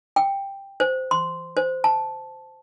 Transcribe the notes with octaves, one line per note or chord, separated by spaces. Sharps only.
G5
C5
C6
C5
A5